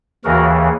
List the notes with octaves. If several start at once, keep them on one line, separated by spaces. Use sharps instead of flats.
D#2 C#3 E3 F#4 A#4